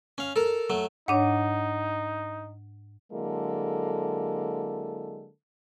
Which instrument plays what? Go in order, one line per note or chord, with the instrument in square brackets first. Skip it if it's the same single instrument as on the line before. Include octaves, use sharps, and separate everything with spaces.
[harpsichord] C#4 F5
A4 A#4
F#3 A3
[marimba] G#2 D4 C#5 [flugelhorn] D#4 [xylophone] F#5 D#7
[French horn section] D3 F#3 G#3 A#3 E4 A4